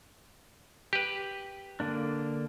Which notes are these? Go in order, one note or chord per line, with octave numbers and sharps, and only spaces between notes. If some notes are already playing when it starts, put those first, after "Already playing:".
G4 B4
D3 A#3 D4